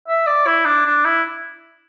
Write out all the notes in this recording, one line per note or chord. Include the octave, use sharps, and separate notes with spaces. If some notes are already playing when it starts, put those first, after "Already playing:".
E5
D5
E4
D4
D4
E4